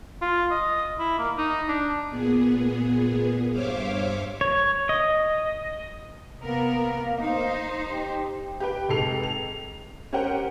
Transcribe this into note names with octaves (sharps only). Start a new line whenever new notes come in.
F4
D#5
E4
A#3
D#4
D4
A#2 B3 G#4
G2 C5 C#5 E5 F5 D6
C#5
D#5
C3 A#3 B3 A#4
D#4 C5
G4
G4 B4 G5
F1 G#2 G#4 A4 C7 F7
F7
C#4 G4 A#4 C5 F#5 G5